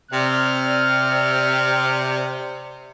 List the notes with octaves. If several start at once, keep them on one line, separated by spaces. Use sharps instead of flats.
C3 D5 F6